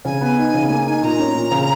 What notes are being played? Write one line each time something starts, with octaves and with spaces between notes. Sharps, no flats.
C#3 G#5
B3
D#4
C#3
A#3
D#4
A#2 A#5
C#4
A#2
C#3